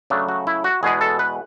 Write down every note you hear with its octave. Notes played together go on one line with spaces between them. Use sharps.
C#3 F#3 A3 D4
F#4
E4
F#4
E2 B2 G#3 B3 G#4
A4
B4